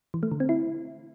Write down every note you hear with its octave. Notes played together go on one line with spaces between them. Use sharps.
E3
A3
D3
C4
E4